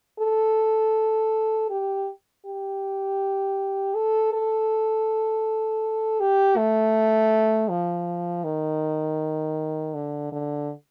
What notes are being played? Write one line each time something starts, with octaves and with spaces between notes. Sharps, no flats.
A4
G4
G4
A4
A4
G4
A3
F3
D#3
D3
D3